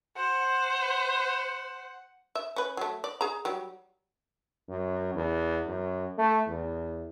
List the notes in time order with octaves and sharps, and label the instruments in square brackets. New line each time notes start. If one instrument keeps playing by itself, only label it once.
[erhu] C5 [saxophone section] F#5
[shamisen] E5
C#4 B4
F#3 A3
D5
G#4 A#5
F#3 G3
[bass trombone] F#2
E2
F#2
A3
E2